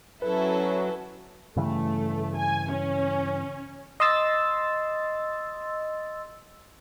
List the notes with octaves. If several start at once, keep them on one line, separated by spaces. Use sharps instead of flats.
F#3 C#4 E4 A4 B4
G2 C#3 E3 A3
G#5
C#4
D#5 C6 E6 A6